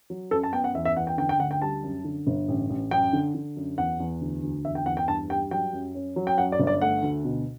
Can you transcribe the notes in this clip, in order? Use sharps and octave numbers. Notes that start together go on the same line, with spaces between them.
F#3
F#2 A4
A5
B3 G5
F#5
E2 E5
E5
E2 F#5
G5
D3 G5
G5
D2 F#5
G5
G3 A5
F#2
D3
G1
A1
A1
F#2 G5
D3
D3
F#2
E2 F#5
E2
D2
D2
E2 E5
G5
E2 F#5
G5
G2 A5
G3 G5
F#3 G5
F#2
C#4
F#3
G5
F#2 F#5
D5
G1
D5
A3 F#5
D2
B2